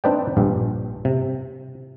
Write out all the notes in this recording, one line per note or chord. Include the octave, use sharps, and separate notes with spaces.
C4 D4 D#4 B4 D5 G5
A#1 G2
C3